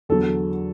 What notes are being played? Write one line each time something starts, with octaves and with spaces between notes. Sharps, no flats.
E2 D3 F#3 A4